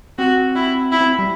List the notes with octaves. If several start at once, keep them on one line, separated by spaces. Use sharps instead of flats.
C4 F#4
E4
E4
C4
G3